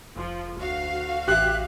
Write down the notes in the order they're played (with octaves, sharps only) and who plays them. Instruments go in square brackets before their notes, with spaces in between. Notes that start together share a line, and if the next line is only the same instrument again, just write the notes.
[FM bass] F1 [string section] F3
[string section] D2 F#4 F5
[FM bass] A1 [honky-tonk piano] G4 E5 [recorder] F#6